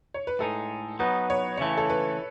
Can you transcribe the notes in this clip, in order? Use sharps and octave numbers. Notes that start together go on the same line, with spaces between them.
C#5
B4
A2 G#3 D#4 A4
F#3 B3 D#4 B4
C#5
C#3 E3 A3 C#5
A4
B4